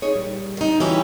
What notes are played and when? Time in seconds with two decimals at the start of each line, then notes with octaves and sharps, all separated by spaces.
0.02 D#4 G#4 C#5
0.16 A#2 G3
0.57 D#3 D#4
0.80 E3 G3 C#4 E4 F#4 G4